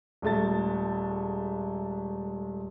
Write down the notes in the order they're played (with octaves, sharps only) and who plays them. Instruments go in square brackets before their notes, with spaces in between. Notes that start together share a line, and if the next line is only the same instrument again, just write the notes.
[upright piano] D#1 G#3 A3 A5 A6